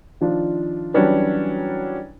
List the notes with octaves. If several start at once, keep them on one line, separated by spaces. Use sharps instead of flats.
D#3 F3 D4 F4
E3 F#3 G3 C#4 D4 B4